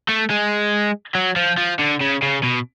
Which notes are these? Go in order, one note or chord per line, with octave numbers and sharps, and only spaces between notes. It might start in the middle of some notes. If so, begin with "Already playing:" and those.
A3
G#3
F#3
F3
F3
D3
C#3
C#3
B2